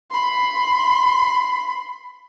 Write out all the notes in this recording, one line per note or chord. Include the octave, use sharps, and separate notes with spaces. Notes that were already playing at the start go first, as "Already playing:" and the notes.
B5 C6